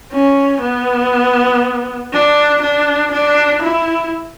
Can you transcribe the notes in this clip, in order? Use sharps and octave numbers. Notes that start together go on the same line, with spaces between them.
C#4
B3
D4
D4
D4
E4